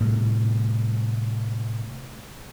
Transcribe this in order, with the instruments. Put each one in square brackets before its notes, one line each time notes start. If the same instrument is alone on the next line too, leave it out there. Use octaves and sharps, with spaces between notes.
[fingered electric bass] A2 C3 G3